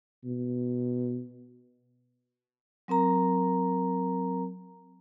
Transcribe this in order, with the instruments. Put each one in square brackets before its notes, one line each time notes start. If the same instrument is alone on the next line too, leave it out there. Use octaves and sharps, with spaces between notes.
[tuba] B2
[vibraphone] F#3 C4 A#4 A#5